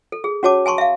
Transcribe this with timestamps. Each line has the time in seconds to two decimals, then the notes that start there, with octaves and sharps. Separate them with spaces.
0.12 A4
0.24 G#4
0.43 C#4 F#4 C#5 A5 D6
0.66 G#5 A5 C6 C#6
0.78 E5 F5